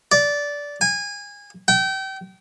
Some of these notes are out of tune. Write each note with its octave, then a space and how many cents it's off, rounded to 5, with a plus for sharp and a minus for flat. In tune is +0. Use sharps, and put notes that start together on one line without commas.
D5 -15
G#5 -25
G5 -30